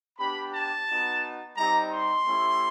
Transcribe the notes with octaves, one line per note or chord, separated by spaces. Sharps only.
B3 D4 G4 B5
A5
B3 D#4 F#4
G3 C4 D#4 G4 A#5
C6
A3 C#4 E4 G4